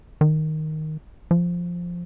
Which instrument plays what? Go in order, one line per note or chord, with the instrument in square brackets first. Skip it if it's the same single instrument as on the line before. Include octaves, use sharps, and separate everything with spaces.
[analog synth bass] D#3
F3